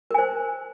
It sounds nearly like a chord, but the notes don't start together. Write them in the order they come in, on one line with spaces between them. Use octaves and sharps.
A#4 G#5 C5